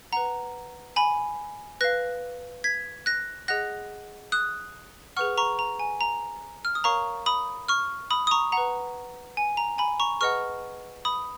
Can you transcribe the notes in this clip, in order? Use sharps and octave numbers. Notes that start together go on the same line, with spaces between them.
B4 F#5 A#5
G#5 B5
B4 F5 F#6 A#6
G#6 B6
F#6 A#6
G#4 D#5 F#5 F#6 A#6
D#6 F#6
G#4 B4 F#5 C#6 F6
A#5 C#6
A#5
G#5
A#5
F6
D#6
A#4 C#5 F5 A#5 C#6
B5 D#6
C#6 F6
B5 D#6
D#6
A#5 C#6
B4 F#5 A#5
G#5
A#5
G#5 B5
A#5 C#6
G#4 B4 D#5 F#5 C#6 F6
B5 D#6